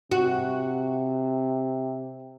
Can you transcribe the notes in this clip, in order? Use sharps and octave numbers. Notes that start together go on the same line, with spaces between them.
C3 F#4